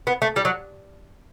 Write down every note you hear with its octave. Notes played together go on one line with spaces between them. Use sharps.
B3
A3
G3
F#3